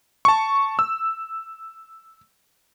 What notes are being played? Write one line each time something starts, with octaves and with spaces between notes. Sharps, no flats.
A5 C#6
E6